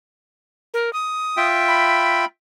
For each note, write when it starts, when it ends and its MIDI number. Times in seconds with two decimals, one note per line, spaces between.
0.74 0.93 70
0.93 1.47 87
1.37 2.25 65
1.37 2.25 76
1.37 2.25 79
1.68 2.26 83